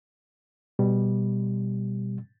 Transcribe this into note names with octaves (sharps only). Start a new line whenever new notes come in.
B2 G3